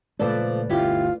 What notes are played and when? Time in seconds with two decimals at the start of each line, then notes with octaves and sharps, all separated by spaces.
0.20 A#2 C#3 F3 G#3 A3 A4 B4 D5
0.69 G1 D2 B2 C#4 E4 F4 G4